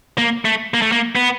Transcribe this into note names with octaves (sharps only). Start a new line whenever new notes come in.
A#3
A3
A#3
A3
A#3
B3